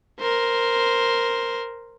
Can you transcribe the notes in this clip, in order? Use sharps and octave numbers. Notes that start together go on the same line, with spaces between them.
A#4 C5